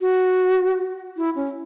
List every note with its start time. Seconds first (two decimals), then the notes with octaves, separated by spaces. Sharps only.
0.01 F#4
1.17 E4
1.36 C#4